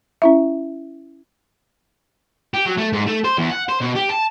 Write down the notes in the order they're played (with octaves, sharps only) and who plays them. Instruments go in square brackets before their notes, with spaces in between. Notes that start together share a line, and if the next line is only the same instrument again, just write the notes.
[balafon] C#4 E4 E5
[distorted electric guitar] G4
F#3
A3
G#2
A3
C5
E2
F#5
C5
B2
G4
A5